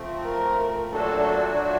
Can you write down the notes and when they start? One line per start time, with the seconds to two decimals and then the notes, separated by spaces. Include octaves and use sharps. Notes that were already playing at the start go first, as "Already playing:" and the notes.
Already playing: F3 A3 C4
0.24 A#4
0.92 A#2 F#3 A3 D4 F#4 A4